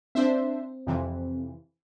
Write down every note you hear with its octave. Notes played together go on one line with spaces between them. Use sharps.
C4 D4 C5 E5
F2 C3 E3